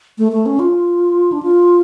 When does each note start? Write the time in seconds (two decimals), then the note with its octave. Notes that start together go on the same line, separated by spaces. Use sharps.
0.18 A3
0.32 A3
0.46 C#4
0.59 F4
1.32 D4
1.43 F4